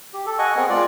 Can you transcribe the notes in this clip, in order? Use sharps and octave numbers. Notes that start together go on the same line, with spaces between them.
G4
A4
D#5 F#5 G#5 C#6
B3 C4 G#4 A#4
G#3 F4 D5